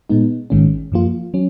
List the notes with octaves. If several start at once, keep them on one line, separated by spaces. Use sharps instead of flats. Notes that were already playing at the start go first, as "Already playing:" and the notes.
A#2 G#3 B3 D#4
G#1 G#2 D#3 G#3 C#4
F#2 F3 A#3 F4
F#3 C#4